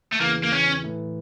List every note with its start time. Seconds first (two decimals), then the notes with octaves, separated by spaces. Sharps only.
0.12 A3
0.20 E2 C#3 E3 A#3
0.43 A#3
0.52 C#4
0.83 A2 E3 A3 E4